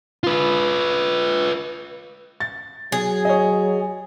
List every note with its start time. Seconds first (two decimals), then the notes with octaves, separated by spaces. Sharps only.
0.24 F4 B4
2.40 A6
2.92 F#3 G#4
3.25 C#5 D#5